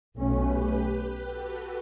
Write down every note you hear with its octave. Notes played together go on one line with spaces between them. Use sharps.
B1 B2 A3 C#4 G4 B4
G4 B4
F#4 A4